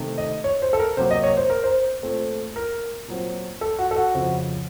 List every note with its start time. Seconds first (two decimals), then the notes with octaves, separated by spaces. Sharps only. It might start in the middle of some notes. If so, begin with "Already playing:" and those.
Already playing: C3 D#3 A3
0.18 D#5
0.44 C#5
0.62 C5
0.73 A4
0.79 A#4
0.97 C3 F#3 A#3 C5
1.11 D#5
1.24 C#5
1.37 C5
1.50 A#4
1.64 C5
2.03 A#2 A3 C4
2.56 A#4
3.08 A#2 F#3 C4
3.61 A4
3.79 F#4
3.91 A4
3.96 F#4
4.14 F2 C#3 F3 C4